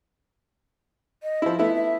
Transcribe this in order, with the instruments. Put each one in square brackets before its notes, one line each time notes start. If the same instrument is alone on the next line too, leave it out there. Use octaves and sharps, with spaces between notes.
[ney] D#5
[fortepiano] F3 E4
[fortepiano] A3 B3 E4 [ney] E5
[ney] E5